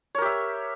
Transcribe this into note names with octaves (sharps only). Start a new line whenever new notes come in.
G4 A#4 C#5 E5